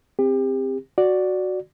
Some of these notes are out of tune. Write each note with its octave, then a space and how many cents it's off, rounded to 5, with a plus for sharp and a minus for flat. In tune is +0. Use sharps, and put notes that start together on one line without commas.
C4 +0 G4 +30
F#4 +0 D5 +0